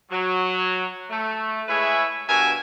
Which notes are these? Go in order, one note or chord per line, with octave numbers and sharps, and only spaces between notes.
F#3
A3
G#3 E4 G#4 B4 C#5 E5
G2 B2 F#4 A#4 E5 G#5